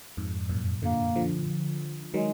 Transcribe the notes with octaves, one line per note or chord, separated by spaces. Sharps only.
F2 G#2
F#2 A#2
A#2 D3 A#3
D3 F3
D#3 F#3 G#3